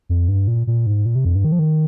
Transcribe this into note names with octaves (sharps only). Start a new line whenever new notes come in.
F2
G2
A#2
A#2
G#2
A#2
C3
F2
G2
D#3
F3
D#3